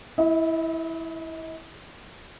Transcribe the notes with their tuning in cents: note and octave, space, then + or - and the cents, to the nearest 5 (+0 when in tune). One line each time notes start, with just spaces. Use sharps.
E4 -5 D#5 +45